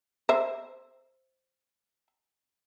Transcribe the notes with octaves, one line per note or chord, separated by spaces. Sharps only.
C5 E5